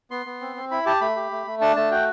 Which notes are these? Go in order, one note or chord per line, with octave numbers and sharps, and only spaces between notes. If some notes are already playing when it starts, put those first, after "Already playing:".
B3 C6
B3
C4
C4
E4 B5
G4 A5
A3 B5
G4
A3
A3
D4 A5
A3 A5
F#4 G5